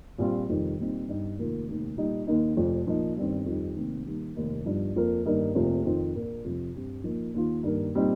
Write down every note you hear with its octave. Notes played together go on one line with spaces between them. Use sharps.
A#1 A#2 G3 C4 F4
F1 F2 D#3 G3
A#2 G3 C4 D#4
G1 G2 G3 D#4
F1 D#2 D#3 A#3 F4
F1 D#2 D#3
A#2 G3 D#4
D#2 D#3 A#3 D#4
F1 F2 F3
A#2 F3 A#3 D#4
G1 G2 D#3 C4
F2 D#3 G3 D#4
F1 D#2 D#3 C4
D#2 D#3 G3
F1 D#2 D#3 A#3 D#4
G1 G2 F3 D#4
F2 F3 A#3
G1 G2 D#3 A#3 D#4
F1 F2 C3 F3 A#3
F2 D#3 C4 F4
A#1 A#2 A#3
F2 C3 F3
G2 G3 C4
A#2 F3 A#3 D#4
D#2 D#3 A#3 F4
G2 D#3 A#3
A#2 G3 C4 D#4